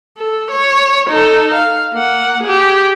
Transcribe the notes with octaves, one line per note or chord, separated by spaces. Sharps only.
A4
C#5
D#4 A4
F5
A#3 F#5
G4 G#4